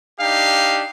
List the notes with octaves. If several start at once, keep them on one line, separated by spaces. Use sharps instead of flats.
D4 D#4 G4 F5